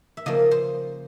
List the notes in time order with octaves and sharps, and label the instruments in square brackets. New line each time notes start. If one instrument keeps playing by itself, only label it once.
[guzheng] E5
C#3 F3 A#3 D#5
C5